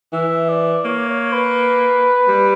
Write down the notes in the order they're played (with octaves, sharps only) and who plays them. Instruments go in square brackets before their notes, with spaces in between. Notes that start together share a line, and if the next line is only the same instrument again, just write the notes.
[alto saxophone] E3 [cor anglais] E5
[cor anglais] D5
[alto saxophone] A#3 [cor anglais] C#5
[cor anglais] C#5
B4
[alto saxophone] G3